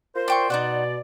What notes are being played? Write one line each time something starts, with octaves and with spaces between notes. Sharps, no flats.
F4 A#4 C5
D5 G5 C#6
B2 D#4 C5 D5 F#5